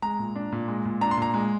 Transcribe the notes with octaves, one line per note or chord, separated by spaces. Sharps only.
G#3 A#5
A#2
D4
A#2
G#3
A#2
D4 A#5
C6
A#2 A#5
G#3